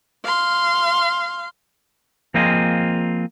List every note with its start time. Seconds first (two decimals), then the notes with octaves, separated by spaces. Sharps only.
0.25 F5 C6
2.34 F3 A#3 C4 F4 G#4 D#5